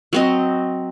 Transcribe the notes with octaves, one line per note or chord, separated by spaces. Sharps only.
F#3 C4 D#5